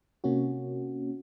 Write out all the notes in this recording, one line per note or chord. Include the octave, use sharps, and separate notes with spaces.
C3 A#3 C#4 F#4